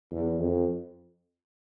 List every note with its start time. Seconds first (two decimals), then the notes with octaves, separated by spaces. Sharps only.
0.12 E2
0.39 F2